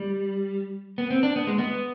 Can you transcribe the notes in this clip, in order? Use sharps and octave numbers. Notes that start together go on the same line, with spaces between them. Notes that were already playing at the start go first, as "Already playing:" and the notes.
Already playing: G3
B3
C4
D4
B3
G#3
B3